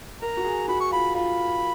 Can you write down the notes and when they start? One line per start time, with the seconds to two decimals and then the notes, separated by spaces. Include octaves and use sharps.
0.21 A#4 A#5
0.37 F#4
0.44 G#4
0.68 F#4 B5
0.80 C#6
0.91 F4 B5
1.15 F4 B5